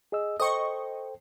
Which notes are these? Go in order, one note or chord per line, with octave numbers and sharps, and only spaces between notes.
G#4 D#5 E6
A4 C5 D#5 G5 C#6